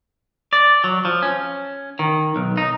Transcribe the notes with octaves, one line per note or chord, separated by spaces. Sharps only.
D5
F#3
F3
C#4
D#3
B1
D#4